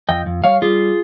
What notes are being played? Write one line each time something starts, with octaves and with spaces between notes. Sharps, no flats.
F2 D#5 G5
F2
G3 C#5 F5
G3 F4 G#4